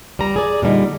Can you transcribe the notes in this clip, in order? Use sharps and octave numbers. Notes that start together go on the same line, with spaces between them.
G3 A#5
G#4 D5
A#2 D3 G3 D#4